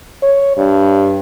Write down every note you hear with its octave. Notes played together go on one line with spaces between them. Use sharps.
C#5
G2